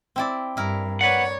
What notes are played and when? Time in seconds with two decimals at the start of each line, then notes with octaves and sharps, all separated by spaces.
0.16 C4 E4 D5
0.57 G2 E4 A#4
1.01 B4 C#5 D5 F#5